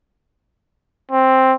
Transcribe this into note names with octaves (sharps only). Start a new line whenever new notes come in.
C4